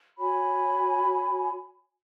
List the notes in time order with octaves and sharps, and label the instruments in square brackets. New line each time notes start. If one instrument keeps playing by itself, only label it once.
[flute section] F#4 C#5 G#5 B5